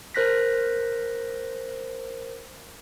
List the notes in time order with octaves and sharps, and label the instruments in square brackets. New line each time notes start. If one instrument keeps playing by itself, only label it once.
[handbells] A#4 C5 F#6 A#6 B6